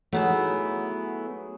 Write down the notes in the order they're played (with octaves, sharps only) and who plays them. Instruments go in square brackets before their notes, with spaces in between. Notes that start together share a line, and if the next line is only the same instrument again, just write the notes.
[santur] F#3 D#4 G#4 [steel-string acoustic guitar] A3 B3 E4